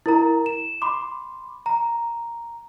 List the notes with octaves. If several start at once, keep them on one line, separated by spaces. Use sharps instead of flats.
E4 A#4 A#5
E7
B5 C6 D6
A#5